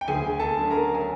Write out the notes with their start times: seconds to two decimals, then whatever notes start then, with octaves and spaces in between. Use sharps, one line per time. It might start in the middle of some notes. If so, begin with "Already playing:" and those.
0.01 G5
0.08 D2 G#4 G#5
0.40 A4 A5
0.55 D3 F#3 A3 C#4
0.70 A#4 A#5
0.94 G#5